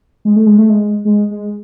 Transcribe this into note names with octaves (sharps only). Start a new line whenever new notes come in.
G#3
A3
G#3
A3
G#3
G#3
G#3